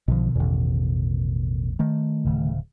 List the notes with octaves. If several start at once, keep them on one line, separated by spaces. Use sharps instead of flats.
B1 B2 D3 D#3 F3
A1 E2
D#3 A3
D1 C#3